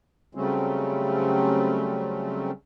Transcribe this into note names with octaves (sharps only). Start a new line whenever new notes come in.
C#3 F#3 G3 A3 C4 C#4